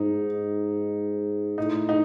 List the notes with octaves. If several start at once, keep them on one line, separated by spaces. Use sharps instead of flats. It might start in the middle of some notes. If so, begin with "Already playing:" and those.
Already playing: G#2 D#4
A2 D#4
D#4